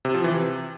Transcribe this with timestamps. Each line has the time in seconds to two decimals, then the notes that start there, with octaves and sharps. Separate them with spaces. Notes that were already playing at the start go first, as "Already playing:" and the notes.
0.05 C3
0.14 F3
0.24 E3
0.34 C3